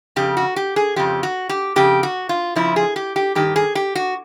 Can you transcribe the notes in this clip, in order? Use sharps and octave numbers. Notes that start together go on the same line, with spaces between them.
F2 C#3 G4
F#4
G4
G#4
F2 C#3 F3 G4
F#4
G4
F2 C#3 G4
F#4
F4
F2 C#3 F3 E4
G#4
G4
G4
G2 D#3 G4
G#4
G4
F#4